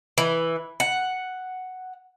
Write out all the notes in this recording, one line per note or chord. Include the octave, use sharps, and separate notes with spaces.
E3
F#5